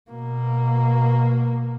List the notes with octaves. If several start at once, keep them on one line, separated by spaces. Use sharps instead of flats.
B2 A#3